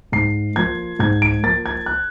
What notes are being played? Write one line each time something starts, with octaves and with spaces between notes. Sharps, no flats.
G#2 C7
F3 A#3 G#6
G#2 G#6
D7
F3 A#3 A6
G#6
F#6